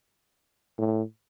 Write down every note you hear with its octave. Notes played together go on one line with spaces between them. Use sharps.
A2